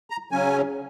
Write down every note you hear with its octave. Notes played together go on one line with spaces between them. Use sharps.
A#5
C#3 F#3 C#4 G#5